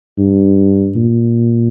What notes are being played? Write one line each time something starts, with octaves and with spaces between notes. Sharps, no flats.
G2
A#2